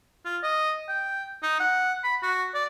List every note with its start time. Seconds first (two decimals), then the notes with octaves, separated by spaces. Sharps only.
0.25 F4
0.43 D#5
0.88 G5
1.43 D#4
1.60 F#5
2.04 B5
2.22 F#4
2.54 D5